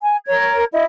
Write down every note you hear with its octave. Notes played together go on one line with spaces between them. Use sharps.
G#5
A#4 C#5 G#6
E4 D#5